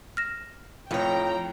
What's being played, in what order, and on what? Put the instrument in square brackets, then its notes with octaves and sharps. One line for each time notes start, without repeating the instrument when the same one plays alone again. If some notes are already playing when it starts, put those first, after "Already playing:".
[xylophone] F6 A#6 E7
[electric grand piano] F2 A2 [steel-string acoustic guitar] F3 C#5 [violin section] G5 A#5